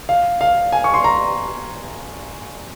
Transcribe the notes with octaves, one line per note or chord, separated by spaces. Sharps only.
F5
F5
G#5
C#6
C6
A#5